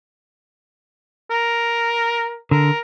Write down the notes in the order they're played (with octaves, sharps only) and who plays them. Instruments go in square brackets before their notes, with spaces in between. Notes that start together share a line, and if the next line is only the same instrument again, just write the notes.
[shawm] A#4
[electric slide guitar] D3 [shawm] A#4